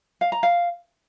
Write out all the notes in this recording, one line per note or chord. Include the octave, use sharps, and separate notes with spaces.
F5
A#5
F5